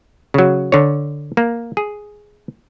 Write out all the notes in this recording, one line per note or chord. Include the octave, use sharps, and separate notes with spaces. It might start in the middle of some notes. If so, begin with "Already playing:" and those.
C#3 F#3
D3 C#5
A#3
G#4